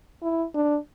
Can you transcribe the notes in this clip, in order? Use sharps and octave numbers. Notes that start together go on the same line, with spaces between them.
E4
D4